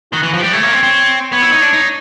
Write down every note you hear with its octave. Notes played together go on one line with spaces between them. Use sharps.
D#3 F#4
E3
F#4
F3
G3 G4
A3 C#5
A#3
C4
C4
B3 C#5
E4
D#4
D4
D#4